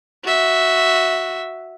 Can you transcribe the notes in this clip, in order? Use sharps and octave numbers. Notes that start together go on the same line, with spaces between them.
F#4 E5